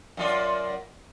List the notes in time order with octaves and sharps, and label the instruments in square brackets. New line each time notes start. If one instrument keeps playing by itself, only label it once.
[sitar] F#2 F4 D5